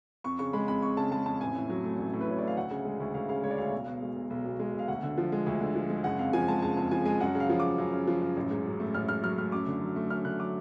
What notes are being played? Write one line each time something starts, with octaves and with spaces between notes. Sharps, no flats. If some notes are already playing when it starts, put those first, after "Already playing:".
F2 C#6
C#3 C#6
G#3 B5
F2 B5
F2 C#6
C#3 A5
G#3 A5
F2 A5
A1 G#5
A2
F#3
A3
A1
A2
B4
F#3 C#5
A3 D5
F5
D2 F#5
C#3
G#3
D2
D2 F5
C#3 F5
G#3 C#5
D5
D2 F5
B1
B2
G#3
B1
B1
B2
G#3
B1
F5
D2 F#5
D3
F3
G#3
D2
D3
F3
G#3
F#1 F#5
F2 F5
F3 G#5
G#3 A5
F#1 A5
F2 A5
F3 G#5
G#3 G#5
F#2 F#5
C#3
F5
F3
F#2 D6
F#2
C#3
F3
F#2
A1
G#2
F#3
A3
A1 F6
G#2 F6
F#3 F6
A3 F6
F#2 D6
D3
F#3
A3
F#2 F6
D3 F#6
F#3 D6